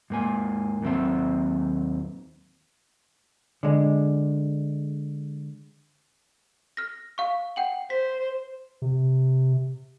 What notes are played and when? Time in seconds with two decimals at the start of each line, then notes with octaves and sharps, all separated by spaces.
0.10 G#2 A#3 G#5
0.82 D#2 F#3 C4 E5
3.63 D3 G#3
6.77 F6 A#6
7.18 F5 C#6
7.56 F#5 G5 F#7
7.90 C5 B6
8.82 C3